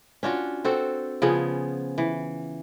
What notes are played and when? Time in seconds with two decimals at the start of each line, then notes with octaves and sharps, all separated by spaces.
0.23 C#4 D4 F4 F#4
0.65 C4 F#4 A4 C5
1.22 C#3 F3 B3 G#4
1.98 E3